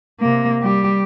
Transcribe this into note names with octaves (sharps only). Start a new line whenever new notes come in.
C3 A#3
G3 G4